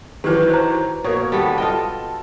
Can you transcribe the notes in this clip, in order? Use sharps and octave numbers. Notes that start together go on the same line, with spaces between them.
D#3 E3 F#3 G4 B4
C5 A#5
B2 A#3 A#4 C#5
D#2 G3 B3 A4
F4 A4 D#5 G5